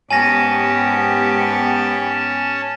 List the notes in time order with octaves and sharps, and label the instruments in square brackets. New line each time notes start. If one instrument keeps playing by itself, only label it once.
[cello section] G#2 B3 G4 [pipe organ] C#4 A5 [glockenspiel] G#5 A#6